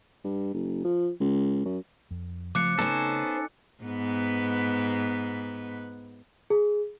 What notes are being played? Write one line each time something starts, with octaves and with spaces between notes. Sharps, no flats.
G2
F#1
F3
C#2
F#2
F2
C#3 F3 A3 C4 D6 F#6 C#7
B3 C#4 D#4 A4 C5
G#2 B3 B4
G#4